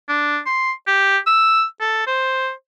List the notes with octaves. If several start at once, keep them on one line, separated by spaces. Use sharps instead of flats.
D4
C6
G4
E6
A4
C5